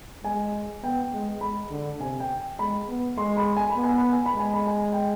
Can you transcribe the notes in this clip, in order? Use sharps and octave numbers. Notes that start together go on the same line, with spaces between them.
G#3 G#5
B3 G5
G#3
G#3 B5
D3
C3 G#5
G5
G#3 B5
B3
G#3 C6
B5
G#5
B5
B3
G#5
B5
G#5
B5
G#3 G#5
B5
G#5
G5